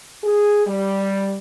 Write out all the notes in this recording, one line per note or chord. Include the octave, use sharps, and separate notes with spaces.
G#4
G3